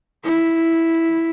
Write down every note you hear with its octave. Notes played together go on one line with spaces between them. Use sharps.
E4